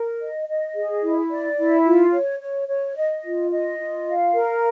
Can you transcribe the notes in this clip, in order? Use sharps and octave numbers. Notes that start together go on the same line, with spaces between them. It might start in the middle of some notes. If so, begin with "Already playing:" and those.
Already playing: A#4
D#5
D#5
G#4
E4
D5
E4
F4
C#5
C#5
C#5
D#5
F4
D#5
F4
F5
A#4